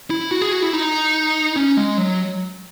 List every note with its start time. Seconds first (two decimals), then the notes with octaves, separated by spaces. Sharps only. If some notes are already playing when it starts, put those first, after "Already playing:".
0.10 E4
0.31 F#4
0.42 G#4
0.52 F#4
0.62 E4
0.73 D#4
1.56 C#4
1.77 G#3
1.98 F#3